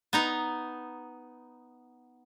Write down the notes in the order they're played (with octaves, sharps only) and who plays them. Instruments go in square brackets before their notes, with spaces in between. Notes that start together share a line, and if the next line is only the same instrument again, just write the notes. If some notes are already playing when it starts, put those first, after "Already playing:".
[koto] B3 D#4 A#5